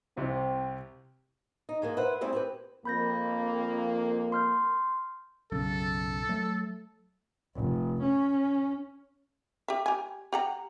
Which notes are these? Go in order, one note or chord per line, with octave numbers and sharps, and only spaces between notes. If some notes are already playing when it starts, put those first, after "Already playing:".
C2 C3 C4
D#4
G#2 G#3 A#3
B4 C5 E5 F#5
G3 A3 C4 E4 G#4
C4 G4 B4
F2 A#3 B5 G6 A#6
C6 F6 G6
B1 F#2 C#3 A4
F#3 A3
F1
C#4
G4 E5
G4 G#5
G4 F#5 A#5